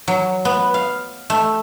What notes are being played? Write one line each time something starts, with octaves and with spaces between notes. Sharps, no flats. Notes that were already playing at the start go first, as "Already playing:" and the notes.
F#3
B3
F5
A3